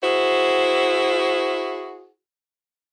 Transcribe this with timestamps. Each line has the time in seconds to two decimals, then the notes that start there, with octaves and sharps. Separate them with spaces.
0.03 E4 F#4 G#4 C5